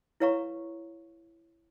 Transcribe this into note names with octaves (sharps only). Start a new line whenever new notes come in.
E4 B4 C#5 F5 A#5 C#6